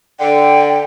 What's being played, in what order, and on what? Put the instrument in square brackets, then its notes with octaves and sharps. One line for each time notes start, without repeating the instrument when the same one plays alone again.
[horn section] D3 [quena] G5